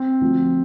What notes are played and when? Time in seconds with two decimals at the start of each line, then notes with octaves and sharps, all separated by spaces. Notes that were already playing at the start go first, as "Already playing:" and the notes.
Already playing: C4
0.21 D2 D3 F3